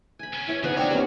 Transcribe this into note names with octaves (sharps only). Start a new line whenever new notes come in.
G#5 B5
B3 C#4
E4 C#5
C#3 F3 B3 D#4 G#4
C4 D4 F#4 C#5 F5 A#5
B3 C#4 G4